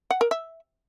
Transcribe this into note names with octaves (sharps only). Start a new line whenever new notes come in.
F#5
A#4
E5